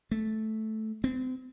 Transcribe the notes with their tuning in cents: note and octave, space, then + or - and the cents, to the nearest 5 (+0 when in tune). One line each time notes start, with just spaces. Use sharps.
A3 -10
C4 -35